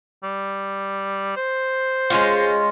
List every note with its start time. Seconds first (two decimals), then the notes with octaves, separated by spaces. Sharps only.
0.24 G3
1.36 C5
2.10 G#3 C#4 F4